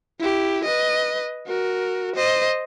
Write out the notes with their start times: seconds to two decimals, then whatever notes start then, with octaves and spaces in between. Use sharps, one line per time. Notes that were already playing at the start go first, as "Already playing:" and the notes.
0.20 E4 G4
0.64 B4 D#5
1.47 F#4 A#4
2.15 C5 D#5